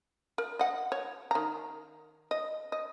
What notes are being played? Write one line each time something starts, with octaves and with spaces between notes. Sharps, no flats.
A#4
D#5 F#5
C#5
D#3 A#5
D#5
D#5